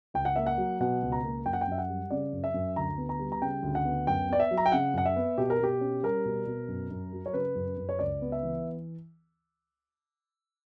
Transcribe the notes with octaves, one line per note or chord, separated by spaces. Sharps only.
C#2 G5
F#5
A#3 E5
F#5
F#3
B2 F#5
C#2
A#5
A#3
F#2 G5
F#5
G5
F#2 E5
F#5
G3
C#3 D5
F#2
E5
F#2
D2 A#5
B3
A#5
G3
A#5
C#3 G5
D2
F#5
B3
F#2 G5
B3 D5
E5
F#3
A#5
G5
C#3 F#5
F#2 F#5
E5
B3
B2 G4
A#4
B2 G4
C#4
G3 A#4
B2
B2
F#2
F#2
F#3
C#5
C#3 B4
F#2
F#2
C#5
C#2 D5
B3
E5
E3